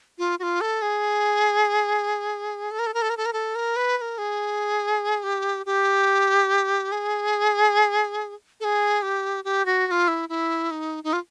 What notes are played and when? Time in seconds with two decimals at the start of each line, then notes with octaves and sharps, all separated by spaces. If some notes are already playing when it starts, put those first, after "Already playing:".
0.18 F4
0.39 F#4
0.43 F4
0.61 A4
0.82 G#4
2.71 A4
2.79 A#4
2.87 A4
2.94 A#4
3.02 A4
3.10 A#4
3.17 A4
3.26 A#4
3.33 A4
3.55 A#4
3.76 B4
3.98 B4
4.01 A#4
4.18 G#4
5.24 G4
5.66 G4
6.92 G#4
8.60 A4
8.64 G#4
9.02 G4
9.44 G4
9.66 F#4
9.87 F#4
9.91 F4
10.08 E4
10.29 E4
10.71 D#4
11.04 D#4
11.13 F4